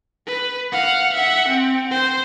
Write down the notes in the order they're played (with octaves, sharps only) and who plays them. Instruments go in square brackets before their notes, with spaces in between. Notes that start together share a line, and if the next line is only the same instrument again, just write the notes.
[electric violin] B4
F5 F#5
E5 F#5
C4
C5